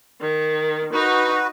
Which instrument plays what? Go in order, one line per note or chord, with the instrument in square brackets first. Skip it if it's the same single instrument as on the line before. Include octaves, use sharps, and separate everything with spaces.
[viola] D#3
[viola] D#4 [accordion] F#4 B4